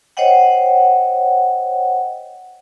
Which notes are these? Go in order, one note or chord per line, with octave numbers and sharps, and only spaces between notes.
C5 C#5 D#5 F#5 G5